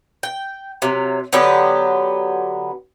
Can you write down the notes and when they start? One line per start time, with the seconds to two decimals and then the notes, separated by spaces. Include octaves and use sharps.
0.23 G5
0.82 C3 F#3
1.33 D3 F#3 B3 G4